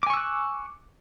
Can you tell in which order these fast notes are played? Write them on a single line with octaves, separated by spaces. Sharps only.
D6 G#5 C#6 E6 F#6